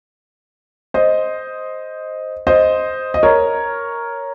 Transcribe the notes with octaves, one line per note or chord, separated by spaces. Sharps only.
C5 D#5
C5 D#5
D#5
A#4 C#5